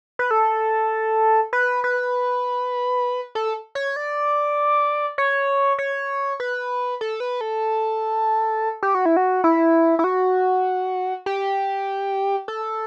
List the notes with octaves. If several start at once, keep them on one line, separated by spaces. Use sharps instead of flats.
B4
A4
B4
B4
A4
C#5
D5
C#5
C#5
B4
A4
B4
A4
G4
F#4
E4
F#4
E4
E4
F#4
G4
A4